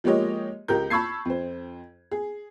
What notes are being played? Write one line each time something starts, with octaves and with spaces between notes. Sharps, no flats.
F3 G#3 A#3 G4 C#5 D#5
C#2 G4 A#4 G6
A5 B5 C#6 E6 G#6 C7
F2 C5
G#4